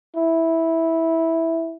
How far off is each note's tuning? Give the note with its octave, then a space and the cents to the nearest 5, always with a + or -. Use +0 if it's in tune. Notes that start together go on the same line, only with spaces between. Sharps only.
E4 -10